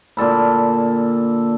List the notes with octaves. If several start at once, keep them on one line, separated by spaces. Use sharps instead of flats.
A#2 D3 A4 B5